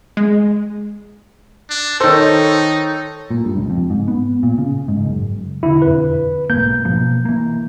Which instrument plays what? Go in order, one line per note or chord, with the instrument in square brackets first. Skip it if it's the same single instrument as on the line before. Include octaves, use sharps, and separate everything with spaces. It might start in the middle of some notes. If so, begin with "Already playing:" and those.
[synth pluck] G#3
[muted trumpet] D4
[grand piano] D#3 C5 [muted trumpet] D#4 [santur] A4 C#5
[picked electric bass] A#2
G2
C#2
F2
G#2
B3
A#2
C#3
G#2
F#1
[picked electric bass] E1 D3 [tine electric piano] E4
[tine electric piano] F2 B4
[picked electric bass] B1 G#2 A#3 [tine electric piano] G6
[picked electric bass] B2 F3 A#3
E3 A#3